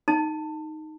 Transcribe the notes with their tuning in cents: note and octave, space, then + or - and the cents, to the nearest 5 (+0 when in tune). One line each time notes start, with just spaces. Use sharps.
D#4 +0 A5 +20